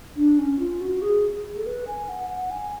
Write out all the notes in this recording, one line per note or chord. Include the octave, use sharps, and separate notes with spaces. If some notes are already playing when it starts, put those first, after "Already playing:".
D4
C#4
F4
F#4
G#4
G#4
A4
B4
G#5
F#5
F#5
G#5